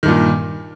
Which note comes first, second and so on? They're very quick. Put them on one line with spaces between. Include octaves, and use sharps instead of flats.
D#3 G2 A#2